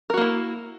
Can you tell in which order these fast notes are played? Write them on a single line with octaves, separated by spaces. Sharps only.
A#4 F#4 A#3 E4